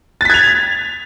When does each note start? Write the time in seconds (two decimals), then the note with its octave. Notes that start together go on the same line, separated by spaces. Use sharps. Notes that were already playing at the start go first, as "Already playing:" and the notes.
0.21 A6
0.25 B6
0.30 G#6
0.34 F7